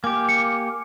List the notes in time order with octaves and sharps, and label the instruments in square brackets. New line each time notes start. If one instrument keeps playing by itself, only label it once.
[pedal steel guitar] A#3 G4 [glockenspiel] G#5 D6
[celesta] C#7